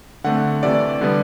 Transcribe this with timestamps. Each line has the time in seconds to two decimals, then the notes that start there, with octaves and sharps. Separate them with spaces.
0.24 D3 A3 C4 F#5
0.63 C3 E3 A3 D5
1.01 D3 G3 B3